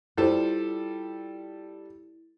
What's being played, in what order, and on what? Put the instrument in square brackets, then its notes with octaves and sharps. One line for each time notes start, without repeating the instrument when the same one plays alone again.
[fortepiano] G3 A4 [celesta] E4 [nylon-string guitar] F4 C5 D5